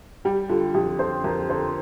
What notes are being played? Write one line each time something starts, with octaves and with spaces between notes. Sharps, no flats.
G3 G4
D3 F4
F2 G4
D3 C5
F2 A#4
D3 C5